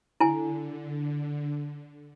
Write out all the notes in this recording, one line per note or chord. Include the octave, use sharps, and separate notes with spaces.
D3 E4 G#5